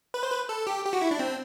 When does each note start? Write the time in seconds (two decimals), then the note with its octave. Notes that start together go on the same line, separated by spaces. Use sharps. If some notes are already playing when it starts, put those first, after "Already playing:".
0.14 B4
0.23 C5
0.32 B4
0.49 A4
0.67 G4
0.85 G4
0.93 F#4
1.02 E4
1.11 D4
1.19 C4